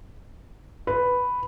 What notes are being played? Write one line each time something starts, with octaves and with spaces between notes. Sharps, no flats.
B4